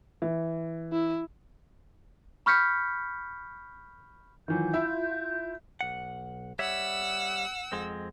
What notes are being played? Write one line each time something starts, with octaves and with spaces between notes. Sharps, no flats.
E3
E4
B5 C#6 F6 G6 B6 C#7
D#3 E3 F#3 F4 G6
E4 E5
B1 F#5
G3 C#5 E5 F#5 E6
F2 G#3 C4